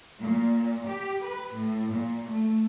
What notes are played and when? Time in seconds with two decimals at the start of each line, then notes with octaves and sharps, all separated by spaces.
0.21 A#2
0.86 G4
1.25 B4
1.55 A2
1.92 A#2
2.29 A3